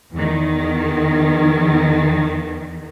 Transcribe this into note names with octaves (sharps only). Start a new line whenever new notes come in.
E2 D#3